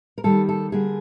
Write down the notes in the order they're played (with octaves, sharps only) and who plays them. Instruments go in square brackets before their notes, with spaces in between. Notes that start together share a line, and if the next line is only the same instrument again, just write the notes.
[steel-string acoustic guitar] A#4
D#3 G3 A#3 A4
A4
D3 G3 A#3 G#4